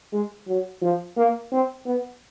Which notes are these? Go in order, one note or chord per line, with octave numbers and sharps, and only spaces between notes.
G#3
F#3
F3
A#3
C4
B3